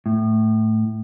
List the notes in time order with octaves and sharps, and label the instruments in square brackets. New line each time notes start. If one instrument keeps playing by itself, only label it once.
[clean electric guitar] A2